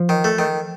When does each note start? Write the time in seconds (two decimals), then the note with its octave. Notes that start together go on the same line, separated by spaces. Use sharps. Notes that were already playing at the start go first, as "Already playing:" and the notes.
Already playing: F3
0.09 D#3
0.24 A3
0.39 D#3